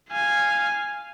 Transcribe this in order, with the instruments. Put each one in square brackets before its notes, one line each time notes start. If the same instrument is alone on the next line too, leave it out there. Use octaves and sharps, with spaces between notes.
[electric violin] F5 G#5